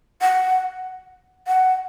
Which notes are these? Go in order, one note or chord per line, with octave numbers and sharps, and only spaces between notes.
F#5
F#5